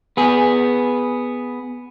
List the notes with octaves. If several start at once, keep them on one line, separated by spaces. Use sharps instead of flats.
B3 G#4